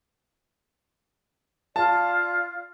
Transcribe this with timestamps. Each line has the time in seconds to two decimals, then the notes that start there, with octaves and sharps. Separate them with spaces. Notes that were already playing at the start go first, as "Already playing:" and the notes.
1.76 F4 D5 F5 A5